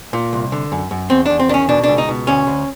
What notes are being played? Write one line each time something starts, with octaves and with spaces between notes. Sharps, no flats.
A#2
C2
D3
F#2
F#2
E2 C4
E2 D4
C4
D#3 C#4 D4
B2 D4
C#2 D4
D#4
B2
D2 C#4
D2